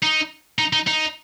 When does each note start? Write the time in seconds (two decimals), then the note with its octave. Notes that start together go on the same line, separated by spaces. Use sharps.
0.03 D#4
0.59 D#4
0.73 D#4
0.87 D#4